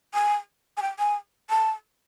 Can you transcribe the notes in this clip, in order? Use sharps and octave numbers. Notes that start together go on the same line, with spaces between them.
G#5
G#5
G5
G#5
A5